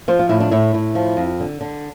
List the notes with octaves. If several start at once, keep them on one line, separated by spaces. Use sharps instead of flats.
F3 C5
F4
A2 E4
D4
A2 E4
A2
F3
F2
D3
D3